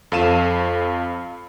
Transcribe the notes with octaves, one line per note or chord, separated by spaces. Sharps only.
F2 A4 F5 D#7 E7